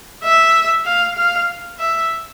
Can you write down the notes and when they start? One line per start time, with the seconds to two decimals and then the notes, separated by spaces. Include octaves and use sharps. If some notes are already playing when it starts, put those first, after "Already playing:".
0.23 E5
0.85 F5
1.16 F5
1.79 E5